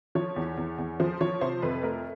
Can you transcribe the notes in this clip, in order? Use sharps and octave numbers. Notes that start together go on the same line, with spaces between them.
F3 C#5
E2
E2
E2
F3 C5
F3 C#5
C3 C5
F2 B4
A3 A#4